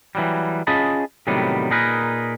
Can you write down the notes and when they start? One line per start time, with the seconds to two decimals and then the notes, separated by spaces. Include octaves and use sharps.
0.15 E3 F#3 G3
0.67 C#4 F4 G#4 D#5 A5 B5
1.27 A2 C3 D#3 F#3 G3 B3
1.71 A#2 D#4 G#4 A#4 B4